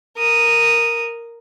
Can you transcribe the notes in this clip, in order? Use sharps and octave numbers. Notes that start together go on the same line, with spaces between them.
A#4 D#6